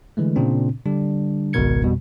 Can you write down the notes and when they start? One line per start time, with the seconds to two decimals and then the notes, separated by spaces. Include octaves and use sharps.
0.17 D3 E3 G#3 A3
0.36 A#2 C#3 C4 D4
0.86 D3 G3 D4
1.53 G#1 C#2 B2 A#4 G#6 C#7
1.83 F2 B2 G3